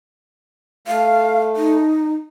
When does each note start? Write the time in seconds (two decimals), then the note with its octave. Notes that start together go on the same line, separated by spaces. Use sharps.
0.88 A3 F5
1.56 D#4